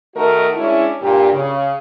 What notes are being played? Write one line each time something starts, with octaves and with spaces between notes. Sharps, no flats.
D#3 A3 D#4 F#4 A#4 D#5
G#3 C#4 D4 E4
G2 A#2 G4
C#3